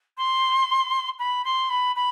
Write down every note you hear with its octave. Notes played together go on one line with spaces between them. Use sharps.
C6
B5
C6
B5
B5